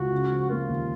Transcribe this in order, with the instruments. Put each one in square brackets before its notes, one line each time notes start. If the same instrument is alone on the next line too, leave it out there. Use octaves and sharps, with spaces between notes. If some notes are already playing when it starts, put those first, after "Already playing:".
Already playing: [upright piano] C#2 [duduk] F#4
[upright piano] C#3
F3
[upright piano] A#3 [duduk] F4
[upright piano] D#2